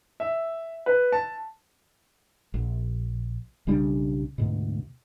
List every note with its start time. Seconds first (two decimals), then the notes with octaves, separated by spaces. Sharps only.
0.20 E5
0.86 B4
1.12 A5
2.54 A#1
3.67 B1 C#3 G3 D4
4.38 D2 G#2 B2